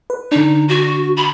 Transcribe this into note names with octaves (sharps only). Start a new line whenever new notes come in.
B4
D3 D4 D#4
F#4
B5